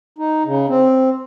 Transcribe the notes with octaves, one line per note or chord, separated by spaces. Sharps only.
D#4
C#3
C4